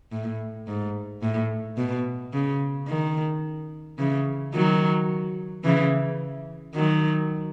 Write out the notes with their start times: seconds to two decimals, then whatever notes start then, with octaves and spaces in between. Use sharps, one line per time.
0.12 A2
0.68 G#2
1.22 A2
1.77 B2
2.33 C#3
2.88 D#3
3.99 C#3 E3
4.54 D#3 F#3
5.64 C#3 E3
6.75 D#3 F#3